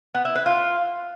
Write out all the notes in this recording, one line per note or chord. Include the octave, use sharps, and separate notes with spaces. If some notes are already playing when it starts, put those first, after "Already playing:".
B3
E4
B4
F4